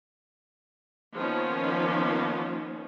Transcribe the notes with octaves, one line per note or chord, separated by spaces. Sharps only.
D#3 F3 A#3 B3 C#4